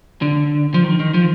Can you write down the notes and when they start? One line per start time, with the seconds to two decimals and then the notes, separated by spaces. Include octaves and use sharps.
0.22 D3
0.74 F3
0.84 D#3
1.00 D#3
1.14 F3